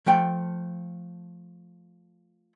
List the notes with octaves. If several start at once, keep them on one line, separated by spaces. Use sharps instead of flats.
F3 A3 G5